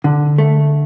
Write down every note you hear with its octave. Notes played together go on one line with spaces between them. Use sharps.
D3
A3